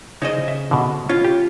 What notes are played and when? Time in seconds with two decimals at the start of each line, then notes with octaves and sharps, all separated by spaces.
0.22 C#3 D#4 C5 C#5 D#5
0.48 E5
0.71 B2 D3
1.09 C#4 F4
1.25 G4